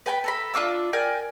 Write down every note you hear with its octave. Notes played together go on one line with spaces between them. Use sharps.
B4 G5 G#5 B5
A4 A#4 B5
D4 F4 D6 E6
A#4 D5 G5 G#5